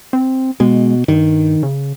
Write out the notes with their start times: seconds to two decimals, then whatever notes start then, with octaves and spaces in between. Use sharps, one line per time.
0.13 C4
0.60 B2 G#3
1.08 G2 D#3
1.63 C#3